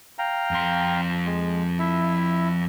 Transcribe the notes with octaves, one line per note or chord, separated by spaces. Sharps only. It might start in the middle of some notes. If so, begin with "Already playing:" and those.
F5 G5 A#5
F2 C6
G#3
E4 E5